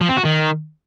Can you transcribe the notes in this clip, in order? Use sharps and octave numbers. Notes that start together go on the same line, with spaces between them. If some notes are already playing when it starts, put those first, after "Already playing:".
F3
C4
F#4
D#3